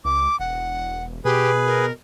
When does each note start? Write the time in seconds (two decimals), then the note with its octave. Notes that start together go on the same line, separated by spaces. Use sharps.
0.05 C#2 D6
0.40 E1 F#5
1.25 B2 G4 G#4 B4
1.66 A#4